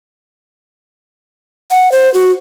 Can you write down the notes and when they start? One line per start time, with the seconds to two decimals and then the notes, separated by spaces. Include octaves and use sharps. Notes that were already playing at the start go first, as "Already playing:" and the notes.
1.71 F#5
1.92 C5
2.14 F#4